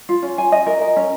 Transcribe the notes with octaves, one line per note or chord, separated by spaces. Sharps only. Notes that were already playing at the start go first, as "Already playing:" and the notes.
F4
C#4
G#5
D#5
A#4
A#4
C#4